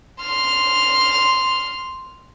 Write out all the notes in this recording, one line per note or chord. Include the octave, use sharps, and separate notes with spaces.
C6 F6